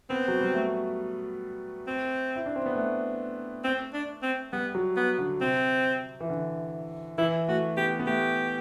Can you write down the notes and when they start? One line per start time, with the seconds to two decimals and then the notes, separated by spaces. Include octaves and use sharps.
0.10 B3 C4
0.28 F#3
0.41 G3
0.54 A3
1.87 C4
2.36 E4
2.46 D4
2.56 C4
2.66 B3
2.76 A3
3.64 C4
3.94 D4
4.23 C4
4.53 G3 B3
4.75 F#3
4.97 B3
5.18 D3
5.41 C3 C4
6.20 E3
6.30 D3
7.18 E3 E4
7.48 A3 F#4
7.77 B3 G4
7.99 B3
8.07 A3 G4